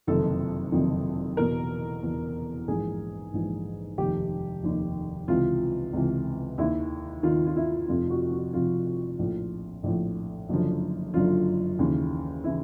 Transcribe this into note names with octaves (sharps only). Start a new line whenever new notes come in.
F#1 F2 C3 D#3 A4
F#1 F2 C3 D#3
E2 B2 A#4
E2 B2
A#1 G#2 E3 G#4
A#1 G#2 E3
F1 D#2 D#3 G4
F1 D#2 D#3
C#2 C3 E3 F4
C#2 C3 E3
D#2 D#3 E4
D#2 D#3 F4
F4
E4
F1 F2 C3 F4
F#4
F#4
F1 F2 C3 F4
A#1 A2 F3
A#1 A2 F3
F#1 F#2 D3 F3
F#1 F#2 D3 F3 F4
D#2 C#3 E3
C#3 E3 E4